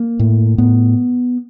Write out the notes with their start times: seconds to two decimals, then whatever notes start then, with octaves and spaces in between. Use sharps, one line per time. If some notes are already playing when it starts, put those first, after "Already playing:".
Already playing: A#3
0.19 A2
0.58 A2 B3